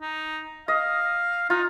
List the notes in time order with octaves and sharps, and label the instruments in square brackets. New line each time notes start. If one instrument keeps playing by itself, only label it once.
[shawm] D#4
[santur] D#5 [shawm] F5
[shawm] D#4 [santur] F4